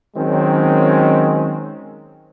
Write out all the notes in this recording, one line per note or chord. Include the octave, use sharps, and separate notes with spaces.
D#3 F#3 G#3 C4 C#4